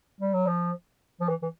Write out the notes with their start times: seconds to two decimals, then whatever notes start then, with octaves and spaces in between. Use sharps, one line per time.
0.21 G3
0.34 F#3
0.47 F3
1.20 F3
1.29 E3
1.42 E3